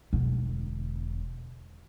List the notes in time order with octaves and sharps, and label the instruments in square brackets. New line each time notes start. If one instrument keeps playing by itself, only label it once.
[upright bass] E1 D3